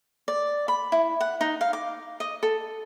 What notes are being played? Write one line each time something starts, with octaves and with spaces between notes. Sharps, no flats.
D5
B5
E4
F#5
D#4
F5
D6
D#5
A4